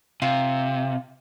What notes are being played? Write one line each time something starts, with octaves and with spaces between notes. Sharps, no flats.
C3 F4